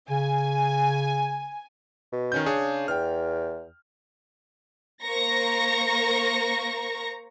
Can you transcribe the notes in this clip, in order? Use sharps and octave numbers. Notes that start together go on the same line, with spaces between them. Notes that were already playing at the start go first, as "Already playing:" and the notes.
C#3 G#5
B2
D#3 C#4 G6
C#3 D4 G#4 C#5
E2 G5 F6
A#3 C5 A#5 C#6 A#6